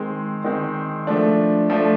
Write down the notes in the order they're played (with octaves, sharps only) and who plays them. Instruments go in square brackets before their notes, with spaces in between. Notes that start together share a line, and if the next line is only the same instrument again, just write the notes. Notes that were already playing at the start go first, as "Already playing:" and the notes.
Already playing: [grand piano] D#3 G#3 C4
D#3 G#3 C4
F3 A3 D4
F3 A3 D4